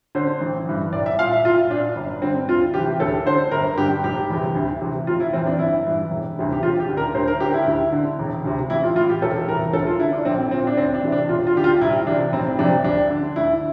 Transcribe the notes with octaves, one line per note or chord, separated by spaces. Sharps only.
D3 C5
A1
G2 E3
C2 D5
E5
A#2 F5
E5
C2 F4
A#2 D4
G1
G2 D3 C4
D2 F4
C3 E3 G4
D2 A4
D3 C5
G1 A#4
G2 D3 G4
F1 G4
E2 C3
D2
C3 E3
F1 F4
E4
E2 E3 C4
D4
G1 E4
G2 E3
E1
D2 C3 E3
G4
E1 F4
G4
D2 D3
A#4
D2 C5
A#4
D3 G4
E4
D2
D3
E1
D2 C3
A1 E4
F4
A2 E3 F4
G4
E1 A4
E2 C3 E3 A#4
D2 A4
F4
D3 E4
D4
A#1 C4
A#2 C4
D4
D2 C4
D4
C3 E3
D4
E1 F4
F4
D2 D3 G4
F4
C2 E4
C3 E3 D4
F1 C4
F2 C3 D4
D2 D4
D3
D2 E4